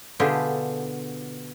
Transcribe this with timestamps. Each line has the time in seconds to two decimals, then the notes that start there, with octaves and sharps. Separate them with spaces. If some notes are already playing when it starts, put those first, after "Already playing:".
0.20 B2 D3 E4 F4 G4 G#4